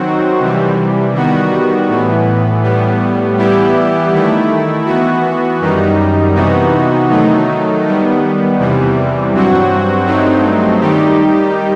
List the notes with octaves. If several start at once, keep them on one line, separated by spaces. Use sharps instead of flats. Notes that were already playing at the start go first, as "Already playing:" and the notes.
Already playing: D#3 F#3 C4 F#4
C3 E3 G3
D#3 G3 B3 F#4
A2 E3 B3
A2 G3 B3
E3 G3 B3 E4 G4
D#3 A3 E4
E3 B3 F#4
F#2 D#3 G3 D#4
C3 E3 B3 D#4 F#4
D#3 F#3 A3 D#4
D#3 G3 B3
E2 C3 E3 G3
G2 F#3 C4 F#4
G2 F#3 A3 C4 D#4
D#3 G3 D#4 G4